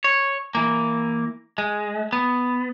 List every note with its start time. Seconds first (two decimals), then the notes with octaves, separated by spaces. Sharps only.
0.04 C#5
0.55 E3 A#3
1.58 G#3
2.13 B3